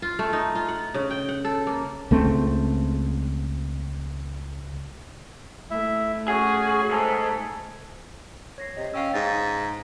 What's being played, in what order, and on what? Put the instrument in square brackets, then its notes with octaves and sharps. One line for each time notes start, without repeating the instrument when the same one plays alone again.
[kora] F4
A3
D#4
F4
F#5
C#3
G5
F#5
A4
A#3
[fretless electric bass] C#2 A3 C4
[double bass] A3 [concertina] E4 E5
[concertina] C#4 F#4 [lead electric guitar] G#4
[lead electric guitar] G#2 [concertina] G#4 A4
[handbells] C#5 A#6 C7
[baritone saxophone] C3 [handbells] D#5
[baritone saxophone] C#4 [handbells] F5 G5 E6
[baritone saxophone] G#2 [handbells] G#4 F5 A6